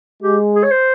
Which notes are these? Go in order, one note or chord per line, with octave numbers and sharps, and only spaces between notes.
G#3 G4
G#4
C#5
C5